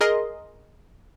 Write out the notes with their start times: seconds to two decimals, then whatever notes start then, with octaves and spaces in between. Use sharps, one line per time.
0.01 G#4 A#4 D#5 C6